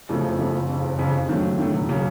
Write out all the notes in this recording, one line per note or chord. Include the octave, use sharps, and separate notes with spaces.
F2 C#3 F3 A3
F#1
F2 C#3 F3 A3
F#1
F2 C#3
F#1
F2 C#3
D#2
D#3 F#3 A3
D#2
D#3 F#3 A3
E1
C#3 F#3 A#3